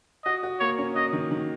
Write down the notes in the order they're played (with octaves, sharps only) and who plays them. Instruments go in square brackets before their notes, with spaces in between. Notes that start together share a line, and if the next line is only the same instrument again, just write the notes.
[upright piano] F#4 [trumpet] D#5
[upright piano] F#4
[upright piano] A#3 [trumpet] C#5
[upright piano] C#4
[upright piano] F#4 [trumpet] D#5
[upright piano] D#3
D#3